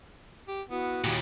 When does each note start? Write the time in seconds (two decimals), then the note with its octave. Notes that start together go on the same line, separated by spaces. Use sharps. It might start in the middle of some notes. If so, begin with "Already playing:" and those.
0.48 G4
0.70 B3 E4 F#4 D#6
1.04 D#2 A#2 G4